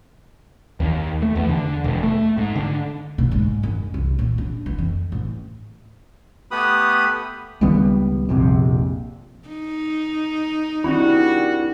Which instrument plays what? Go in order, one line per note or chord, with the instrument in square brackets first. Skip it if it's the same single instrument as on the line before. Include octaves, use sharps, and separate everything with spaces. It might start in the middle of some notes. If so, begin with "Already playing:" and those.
[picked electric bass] D#2
A3
E2
D3
E1
A3
G#2
D3
[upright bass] B2
G#2
F#2
C2
A#2
D4
E3
F2
A1
[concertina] A3 B3 G4 B4 B5 D#6
[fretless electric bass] C#2 D#3 G3 B3
A#1 F2 C3
[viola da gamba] D#4
[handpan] D#3 C4 D4 [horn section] G3 F#4 [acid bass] E4